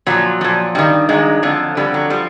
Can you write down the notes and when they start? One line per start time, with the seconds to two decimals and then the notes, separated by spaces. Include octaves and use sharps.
0.06 A#2 F3 F#3
0.41 A#2 F3
0.75 G2 D#3 G3
1.09 G2 D#3 F#3 G#3
1.43 F2 D3 F3
1.77 F2 D3 G3
1.94 F#3
2.10 F3 G3